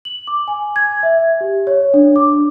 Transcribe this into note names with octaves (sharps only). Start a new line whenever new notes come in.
F#7
D6
G#5
G#6
E5
G4
C#5
D4
D6